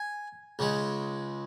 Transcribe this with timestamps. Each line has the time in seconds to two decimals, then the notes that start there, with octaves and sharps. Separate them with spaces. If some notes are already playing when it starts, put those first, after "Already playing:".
Already playing: G#5
0.59 C#2 C#3 G#3